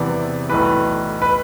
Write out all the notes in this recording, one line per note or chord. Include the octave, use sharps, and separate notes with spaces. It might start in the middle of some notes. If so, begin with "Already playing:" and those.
Already playing: E2 C3 E3 G3 B3 D5
B1 A2 E3 B4
B4